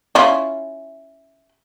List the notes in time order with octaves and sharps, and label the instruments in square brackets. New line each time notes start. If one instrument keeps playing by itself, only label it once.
[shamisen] C#4 E4 F4